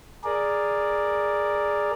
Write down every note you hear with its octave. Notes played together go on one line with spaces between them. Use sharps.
G#4 A#4 D5